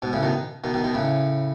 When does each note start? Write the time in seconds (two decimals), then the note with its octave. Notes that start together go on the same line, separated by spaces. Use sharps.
0.02 G#2 B2
0.13 A2 C#3
0.22 B2 D#3
0.64 B2 D#3
0.74 B2 D#3
0.84 B2 D#3
0.94 A2 C#3